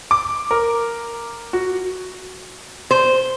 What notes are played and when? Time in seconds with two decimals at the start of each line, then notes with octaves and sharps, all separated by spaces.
0.11 D6
0.51 A#4
1.53 F#4
2.91 C5